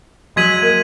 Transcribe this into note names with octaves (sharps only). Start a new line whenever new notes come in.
F#3 G#3 G#6 B6 D#7 F#7
A#3